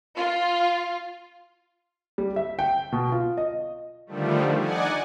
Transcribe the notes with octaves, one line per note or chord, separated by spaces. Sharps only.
F4
G3
E5
G5
B2
F4
D#5
D3 D#3 F3 G3 A3
D#4 D5 F#5 G#5